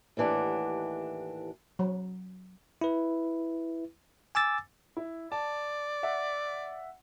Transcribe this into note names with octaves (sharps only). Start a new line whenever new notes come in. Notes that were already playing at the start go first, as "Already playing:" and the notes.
D#2 A2 E3 D4 G4 F#5
F#3
E4 B4
G#5 D6 E6 A6
E4
D5 A5
E5 F#5